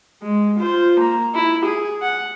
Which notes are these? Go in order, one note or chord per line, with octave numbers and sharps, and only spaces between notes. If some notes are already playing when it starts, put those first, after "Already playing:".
G#3
F4 C5
A#3 A#5
E4
G#4
F#5